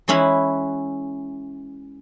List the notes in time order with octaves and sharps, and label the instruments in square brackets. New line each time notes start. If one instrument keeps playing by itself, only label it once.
[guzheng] E3 G#3 C#4 E4 B4